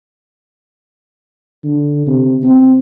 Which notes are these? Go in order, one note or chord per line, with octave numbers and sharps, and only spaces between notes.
D3
C3
C4